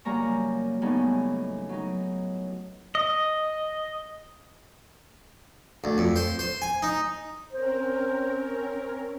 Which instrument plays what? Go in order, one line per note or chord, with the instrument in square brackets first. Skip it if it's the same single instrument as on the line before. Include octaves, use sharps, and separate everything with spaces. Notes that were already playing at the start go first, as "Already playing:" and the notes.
[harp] F#2 C#3 G3 A#3 A#5 C#6
F#2 A2 C#3 G3 B3 D#4
F#3 D#4
[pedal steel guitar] D#5
[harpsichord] D2
F2
C5
C5
G#5
D#4
[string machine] C4 C#4 A#4 [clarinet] C5